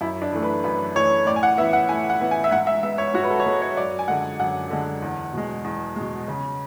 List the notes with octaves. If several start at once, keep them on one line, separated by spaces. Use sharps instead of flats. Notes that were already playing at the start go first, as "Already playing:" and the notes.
F#2 E4
D4
E3 A3
B4
F#2 B4
E3 A3 C#5
A2 D5
G#5
F#5
E3 B3 E5
F#5
A2 G#5
F#5
E3 B3
G#5
E5
G#2 F#5
E5
G#3 B3 E5
C#5
G#2 F#4
B4
A4
C#5
G#3 B3 B4
C#5
F#2 D5
G#5
D3 G#3 F#5
F#2 F#5
D3 G#3
E2
B2 G#3
E2
B2 G#3
C#3